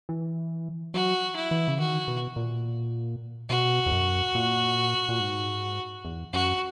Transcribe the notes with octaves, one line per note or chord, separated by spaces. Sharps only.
E3
F#3 F#4
E4
E3
C#3
D#3 F#4
B2
A#2
B2 F#4
E2
F#2
A#2
A#2
G#2
E2
F#2 F#4